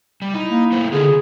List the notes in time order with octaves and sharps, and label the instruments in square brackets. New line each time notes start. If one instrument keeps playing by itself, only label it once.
[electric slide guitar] G3
[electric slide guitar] D#4 [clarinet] E4
[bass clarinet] A#3
[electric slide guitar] A3 B3 C5
[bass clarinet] D3 [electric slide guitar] B3 D#4 F4 [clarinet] G#4
[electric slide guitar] C#3 [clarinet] G#4